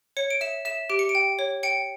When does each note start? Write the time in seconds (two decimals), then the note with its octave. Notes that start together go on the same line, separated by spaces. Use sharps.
0.17 C#5 C#7
0.30 D7
0.41 E5 E7
0.65 E5 E7
0.90 G4 D7
0.99 C#7
1.09 D7
1.15 G5
1.39 C#5
1.63 G5 C#7